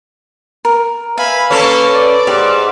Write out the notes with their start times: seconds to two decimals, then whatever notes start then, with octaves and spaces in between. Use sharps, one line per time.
0.65 A#4
1.18 B4 E5 F5 G#5 B5
1.50 A#3 C#4 A4
1.93 D5
2.27 G#2 G4